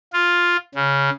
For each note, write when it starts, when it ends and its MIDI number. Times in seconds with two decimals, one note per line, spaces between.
0.13 0.57 65
0.75 1.10 49